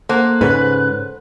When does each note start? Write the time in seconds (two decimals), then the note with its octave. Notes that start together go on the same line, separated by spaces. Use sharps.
0.09 A#3 A4 C5 F#5 F#6
0.41 G#2 C#3 B4